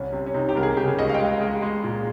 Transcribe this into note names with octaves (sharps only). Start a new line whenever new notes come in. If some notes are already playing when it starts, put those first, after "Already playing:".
Already playing: C2 C#4
C3
C#4
C3 D#4
G4
C2 A#4
G#4
C#3 G4
G#4
C#2 D#5
F5
G5
G#3 F5
G#3
G#3
A#2